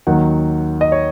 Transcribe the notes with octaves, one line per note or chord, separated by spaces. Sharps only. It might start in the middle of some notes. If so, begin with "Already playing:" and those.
D#2 D#3 F#3 F#5
D#5
C#5